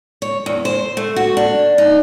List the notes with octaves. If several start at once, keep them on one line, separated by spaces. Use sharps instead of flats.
C#5
E2
C5
A3
F#4
D4
D#4